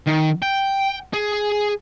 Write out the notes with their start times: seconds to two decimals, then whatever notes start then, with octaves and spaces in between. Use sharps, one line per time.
0.07 D#3
0.42 G5
1.13 G#4